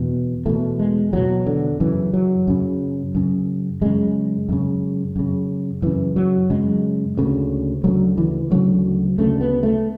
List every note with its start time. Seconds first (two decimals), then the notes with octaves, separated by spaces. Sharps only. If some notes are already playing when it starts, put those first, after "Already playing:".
Already playing: E2 B2
0.46 E2 B2 A3
0.79 G#3
1.13 E2 B2 F#3
1.46 D3
1.80 F#2 C#3 E3
2.14 F#3
2.47 F#2 C#3
3.15 F#2 C#3
3.81 F#2 C#3 G#3
4.49 F#2 C#3
5.16 F#2 C#3
5.82 F#2 C#3 E3
6.16 F#3
6.50 F#2 C#3 G#3
7.17 D2 C#3
7.84 D2 C#3 F#3
8.18 E3
8.51 D2 C#3 F#3
9.18 D2 C#3 A3
9.41 B3
9.63 A3